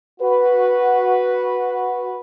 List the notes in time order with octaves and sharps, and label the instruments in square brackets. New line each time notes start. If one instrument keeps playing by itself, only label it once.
[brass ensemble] F#4 B4